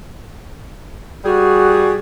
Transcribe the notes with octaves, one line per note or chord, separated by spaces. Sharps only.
G3 F#4 G#4